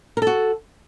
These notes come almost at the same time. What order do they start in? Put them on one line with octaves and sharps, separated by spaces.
A#4 A4 F#4